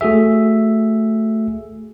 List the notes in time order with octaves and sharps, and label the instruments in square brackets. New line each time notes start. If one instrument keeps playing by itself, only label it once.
[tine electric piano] A3 F#4 G#4 E5